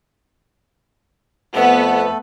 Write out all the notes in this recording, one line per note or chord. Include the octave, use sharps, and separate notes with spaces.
F2 A3 B3 A4 B4 F#5